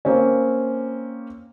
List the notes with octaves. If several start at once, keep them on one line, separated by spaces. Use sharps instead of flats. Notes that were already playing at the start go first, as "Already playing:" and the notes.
A#3 C4 C#4